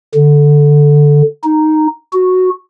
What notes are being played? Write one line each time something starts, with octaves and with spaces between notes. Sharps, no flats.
D3
D#4
F#4